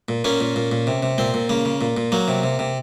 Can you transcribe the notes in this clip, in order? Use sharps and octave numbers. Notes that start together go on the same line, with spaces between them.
A#2
A#2 A#3 C#4
A#2
A#2
A#2
C3
C3
A#2 C4
A#2
C#3 A#3
C#3
A#2
A#2
F#3 A#3
C3
C3
C3